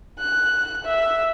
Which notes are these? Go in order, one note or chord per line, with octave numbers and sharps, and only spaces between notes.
F#6
E5